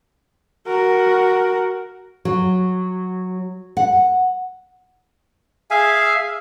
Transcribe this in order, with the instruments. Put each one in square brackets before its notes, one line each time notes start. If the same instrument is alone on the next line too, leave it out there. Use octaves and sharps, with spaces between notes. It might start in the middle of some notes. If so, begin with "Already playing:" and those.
[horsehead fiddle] F#4 A#4
[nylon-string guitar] F#3
F#5
[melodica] G#4 E5 F5 G#5